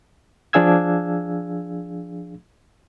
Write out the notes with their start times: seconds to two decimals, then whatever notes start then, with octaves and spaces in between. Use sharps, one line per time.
0.53 F3 D4 G#4 F5 E6 G#6